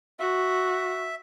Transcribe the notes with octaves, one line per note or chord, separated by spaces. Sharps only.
F#4 E5